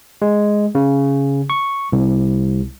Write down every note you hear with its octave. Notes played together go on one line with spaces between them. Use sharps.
G#3
C#3
C#6
C2